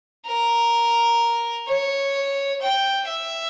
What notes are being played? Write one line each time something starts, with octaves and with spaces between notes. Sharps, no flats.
A#4
C#5
G5
E5